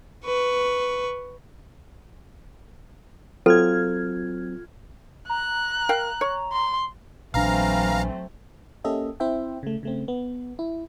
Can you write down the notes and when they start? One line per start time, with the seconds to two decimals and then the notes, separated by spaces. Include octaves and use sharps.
0.25 B4 C#6
3.46 F#3 C4 F4 A4 F6 G#6
5.30 A#5 F#6
5.89 A#4 F5 G5
6.21 C#5
6.53 C6
7.34 A#1 E3 F#3 A3 C4 D4 F5 A#5
8.84 A#3 C#4 G4 A4 D#5 E5
9.20 C4 E4 C5 E5 G5
9.63 C#3 A3
9.83 C#3 A3 C4
10.08 B3
10.59 E4